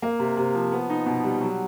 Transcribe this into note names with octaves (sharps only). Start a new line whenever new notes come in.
A#3
C3
C3
F3
B3
D#4
B2
G3
F#3